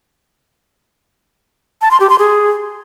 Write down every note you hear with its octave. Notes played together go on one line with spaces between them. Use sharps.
A5
C6
G4
C6
G#4